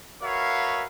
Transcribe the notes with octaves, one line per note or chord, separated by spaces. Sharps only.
F#4 A#4 B4 C#5 E5 F5